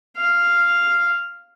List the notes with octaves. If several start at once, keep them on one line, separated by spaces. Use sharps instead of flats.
F5